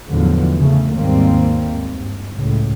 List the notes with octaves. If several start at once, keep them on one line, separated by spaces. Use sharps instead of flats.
E2 A2 D3 F3 F#3
C#3 A3
D#2 G#2 D#3 G3 A#3 C4
G2
C#2 A2